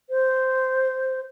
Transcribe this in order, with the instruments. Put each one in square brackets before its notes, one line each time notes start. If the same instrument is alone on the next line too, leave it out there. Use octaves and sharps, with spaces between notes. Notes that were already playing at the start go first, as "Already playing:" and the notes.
[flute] C5